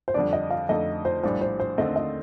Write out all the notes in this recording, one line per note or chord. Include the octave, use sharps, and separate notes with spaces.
C5
F2 D3 G3 D4 D5
D#5
F5
F2 D3 A3 D#4 D#5
C5
A#1 A2 G3 D4 C5
C5
C5
D#2 D3 A3 C4 D#5
D#5